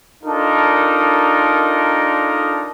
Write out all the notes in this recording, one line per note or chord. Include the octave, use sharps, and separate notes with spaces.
D4 D#4 F4 A4 A#4